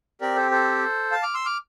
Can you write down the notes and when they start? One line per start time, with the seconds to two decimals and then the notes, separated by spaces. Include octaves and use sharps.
0.21 C4 G4 A#4 D5
0.36 A4 C5
0.51 A4 C5
1.11 F5 A5
1.23 D6 F6
1.34 C6 E6
1.46 D6 F6